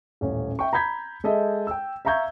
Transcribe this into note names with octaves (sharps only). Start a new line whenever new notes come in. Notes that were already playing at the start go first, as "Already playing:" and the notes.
D#1 A1 C#4
E5 G5 C#6
A#5 B5 G6 G#6 B6
G#3 A4 D#5 E5
G5 E6
E5 F5 A#5 C#6 G6 G#6